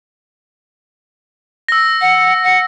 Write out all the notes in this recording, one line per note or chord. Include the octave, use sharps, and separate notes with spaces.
E6 A#6
F#5
F#5